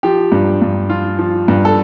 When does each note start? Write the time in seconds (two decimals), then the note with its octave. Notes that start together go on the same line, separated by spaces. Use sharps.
0.03 F3 G4
0.32 G2
0.62 G2
0.90 F3 F4
1.19 F3
1.48 G2
1.65 A4